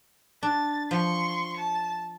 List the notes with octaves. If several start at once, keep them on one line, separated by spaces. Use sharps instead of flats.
D4 A6
F3 C6 C#6
A5